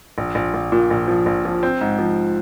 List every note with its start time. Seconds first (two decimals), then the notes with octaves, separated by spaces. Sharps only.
0.18 A#1
0.35 A#1
0.54 A#1
0.72 A#2
0.90 A#1
1.08 F3
1.26 A#1
1.45 F3
1.63 C4
1.81 G#2
1.99 F3